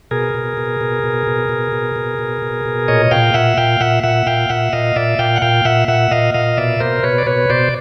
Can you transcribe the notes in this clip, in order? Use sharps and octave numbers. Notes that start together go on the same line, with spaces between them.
B2 G#4 A#4
B2
B2
B2
B2
B2
B2
B2
B2
B2
B2
B2
A#2 C#5 D#5
A#2 F5 G5
A#2 E5 F#5
A#2 F5 G5
A#2 E5 F#5
A#2 E5 F#5
A#2 F5 G5
A#2 E5 F#5
A#2 D#5 F5
A#2 D5 E5
A#2 F5 G5
F#5
A#2 F5 G5
A#2 E5 F#5
A#2 E5 F#5
A#2 D#5 F5
A#2 D#5 F5
B2 D5 E5
B2 A#4 C5
B2 B4 C#5
D5
B2 B4 C#5
B2 C5 D5